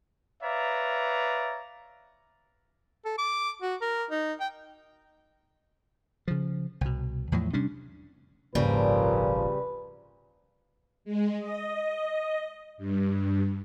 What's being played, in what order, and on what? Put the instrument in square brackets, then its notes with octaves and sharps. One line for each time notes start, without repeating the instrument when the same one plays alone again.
[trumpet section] B4 C#5 D5 E5 F5 A#5
[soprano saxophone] A4
D6
F#4
A#4
D#4
G5
[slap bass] C#3 F3
C2 B2
E2 A2 F3 F#3
C3 G3 C#4 D4
[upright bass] D#1 G#1 [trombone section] A#2 F3 [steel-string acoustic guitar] C#3 G3 [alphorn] B4
[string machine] G#3
D#5
G2